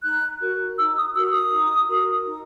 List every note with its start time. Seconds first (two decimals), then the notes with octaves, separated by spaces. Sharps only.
0.03 D#4 F#6
0.41 F#4 A#4
0.78 D#4 E6
0.97 D#6
1.15 F#4 A#4 E6
1.33 D#6
1.51 D#4
1.88 F#4 A#4
2.24 D#4